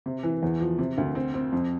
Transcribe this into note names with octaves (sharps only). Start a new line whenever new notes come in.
C3
E3
E2
F3
C3
D2
C4
C4
F2